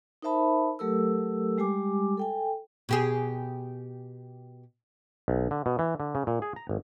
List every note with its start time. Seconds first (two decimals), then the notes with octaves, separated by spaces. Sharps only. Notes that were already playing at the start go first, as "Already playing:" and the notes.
0.22 D#4 A#4 C5 E5 A5 B5
0.79 F#3 A3 G4 A4 A#4 E6
1.58 G3 G#3 G4 G#5 D6
2.17 A4 G5 G#5
2.89 B2 G4 G#4
5.28 B1
5.51 D3
5.66 B2
5.79 E3
6.00 D3
6.15 C#3
6.27 A#2
6.42 G#4
6.56 A#5
6.69 G#1